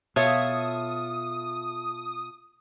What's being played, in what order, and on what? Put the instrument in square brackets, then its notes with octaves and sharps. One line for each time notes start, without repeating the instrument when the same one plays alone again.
[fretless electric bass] B2 [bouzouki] F4 A4 E5 [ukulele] C#5 [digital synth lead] D#6